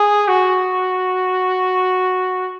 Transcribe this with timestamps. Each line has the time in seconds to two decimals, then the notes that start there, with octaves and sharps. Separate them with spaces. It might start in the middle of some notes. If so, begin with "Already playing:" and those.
Already playing: G#4
0.28 F#4